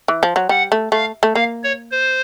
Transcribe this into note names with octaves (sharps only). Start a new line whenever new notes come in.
E3
F3
F#3
G3 F#5
A3
A3 F5
A3
A#3 F5
C#5
C5